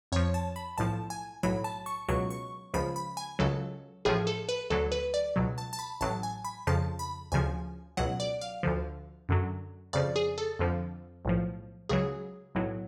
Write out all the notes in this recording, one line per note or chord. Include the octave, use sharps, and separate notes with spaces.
F2 F3 C#5
A5
B5
B1 A2 F3 A5
G#5
B1 A2 F#3 B5
A5
C#6
C#2 B2 F#3 C#6
C#6
C#2 C#3 F3 B5
B5
G#5
C#2 C#3 F#3 A4
A1 A2 F3 G#4
A4
B4
D2 D3 F#3 A4
B4
D5
C#2 B2 F#3
A5
A5
B5
A1 A2 F#3 A5
G#5
B5
F2 C#3 F3 A5
B5
D2 C#3 F3 G#5
C#2 B2 F#3 F#5
D5
F5
D2 D3 F3
F#2 D3 F#3
F2 C#3 F3 D5
G#4
A4
F2 D3 F3
B1 A2 F3
C#2 C#3 F#3 G#4
B1 A2 F#3